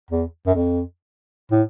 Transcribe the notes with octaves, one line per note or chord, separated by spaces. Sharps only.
E2
F#2
F2
A2